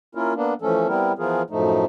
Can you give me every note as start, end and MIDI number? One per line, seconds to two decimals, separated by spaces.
0.15 0.33 58
0.15 0.33 61
0.15 0.33 64
0.15 0.33 65
0.15 0.33 70
0.35 0.54 58
0.35 0.54 59
0.35 0.54 62
0.62 0.87 52
0.62 0.87 53
0.62 0.87 57
0.62 0.87 61
0.62 0.87 69
0.88 1.13 55
0.88 1.13 59
0.88 1.13 60
0.88 1.13 64
0.88 1.13 70
1.19 1.42 52
1.19 1.42 53
1.19 1.42 59
1.19 1.42 65
1.19 1.42 68
1.19 1.42 70
1.50 1.85 42
1.50 1.85 45
1.50 1.85 53
1.50 1.85 57
1.50 1.85 63